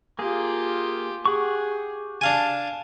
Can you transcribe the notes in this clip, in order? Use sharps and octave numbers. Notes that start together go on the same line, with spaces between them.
A#3 F4 G4 G#4
G4 G#4 F#5 C#6
D4 F5 G#5 A5